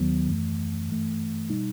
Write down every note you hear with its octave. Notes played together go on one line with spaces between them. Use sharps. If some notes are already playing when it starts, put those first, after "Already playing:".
Already playing: D#2 D#3 F#3 B3
F#2 E3 A3
G2 E3 A3
B2 G3 D#4